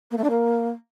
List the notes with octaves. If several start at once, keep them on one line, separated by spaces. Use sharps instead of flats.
A#3
A3
D4
A#3